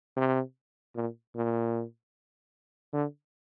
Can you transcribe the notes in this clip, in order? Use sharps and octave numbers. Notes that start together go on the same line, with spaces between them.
C3
A#2
A#2
D3